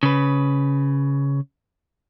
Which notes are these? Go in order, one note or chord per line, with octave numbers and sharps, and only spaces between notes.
C#3 B4